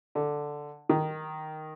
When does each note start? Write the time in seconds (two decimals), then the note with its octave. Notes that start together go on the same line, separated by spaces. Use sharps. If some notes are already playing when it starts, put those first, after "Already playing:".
0.15 D3
0.89 D#3